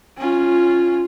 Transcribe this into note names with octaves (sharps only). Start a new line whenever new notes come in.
C#4 F4